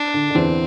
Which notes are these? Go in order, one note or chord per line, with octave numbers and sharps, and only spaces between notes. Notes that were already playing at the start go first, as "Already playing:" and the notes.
Already playing: D4
D3
D3
E2 E3 C4